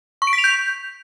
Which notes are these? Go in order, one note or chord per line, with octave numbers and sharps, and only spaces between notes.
C#6
D7
B6
F7
G6